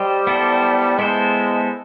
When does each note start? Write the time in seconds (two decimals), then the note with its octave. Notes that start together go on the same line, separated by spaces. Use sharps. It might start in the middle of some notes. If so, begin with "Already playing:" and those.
Already playing: G3 G4 C5 D#5
0.27 B3 E4 A4 C5
0.99 G#3 B3 E4 A4 C5